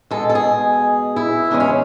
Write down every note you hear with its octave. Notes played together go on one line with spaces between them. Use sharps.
B2 G#3 A4
A4
G#4
E4
E2 C#3 G#3 D4
C#4